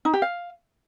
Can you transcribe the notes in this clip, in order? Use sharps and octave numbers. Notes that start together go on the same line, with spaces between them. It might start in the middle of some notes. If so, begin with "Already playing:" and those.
D#4
G4
F5